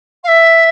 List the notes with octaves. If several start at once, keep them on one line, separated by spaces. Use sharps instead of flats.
F5
E5